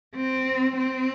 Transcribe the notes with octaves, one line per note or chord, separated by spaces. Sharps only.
C4
C4